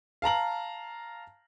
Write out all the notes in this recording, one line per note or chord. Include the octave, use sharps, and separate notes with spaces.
F5 A5 A#5 F#7